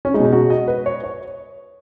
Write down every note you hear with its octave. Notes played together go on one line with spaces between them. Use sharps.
C#4
G#3 D#4
B2
D#4
F#4
D#5
B4
C#5
C#5